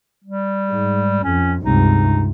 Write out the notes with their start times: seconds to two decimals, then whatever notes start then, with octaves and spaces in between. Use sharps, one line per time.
0.24 G3
0.70 G#2
1.24 F2 C#4
1.63 C#2 G2 C3 D#4